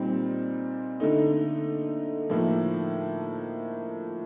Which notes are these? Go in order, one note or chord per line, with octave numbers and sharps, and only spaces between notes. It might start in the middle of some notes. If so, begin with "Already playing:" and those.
Already playing: A#2 G3 C4 D#4
D3 A3 D#4
A2 F3 A#3 D#4